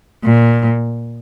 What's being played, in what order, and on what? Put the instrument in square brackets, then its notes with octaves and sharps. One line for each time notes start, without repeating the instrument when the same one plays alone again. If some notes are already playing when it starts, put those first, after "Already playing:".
[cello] A#2